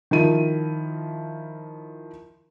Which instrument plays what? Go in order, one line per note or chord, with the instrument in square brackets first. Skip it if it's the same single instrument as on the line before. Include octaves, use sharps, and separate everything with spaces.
[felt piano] D#3 F3 E4 D#7